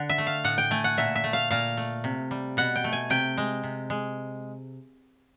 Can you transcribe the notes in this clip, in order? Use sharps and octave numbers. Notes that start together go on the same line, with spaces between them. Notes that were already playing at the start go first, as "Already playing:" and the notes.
Already playing: D3 F#5
E5
A3
F5
A2 F#5
G5
A3 G#5
F#5
A#2 E5
E5
A3
F5
A#2 F5
A3
C3
G3
B2 F#5
G5
A3
G#5
C3 G5
G#3
C3
G#3